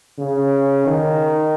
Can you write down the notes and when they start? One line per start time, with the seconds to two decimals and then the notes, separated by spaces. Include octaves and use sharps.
0.19 C#3
0.87 D#3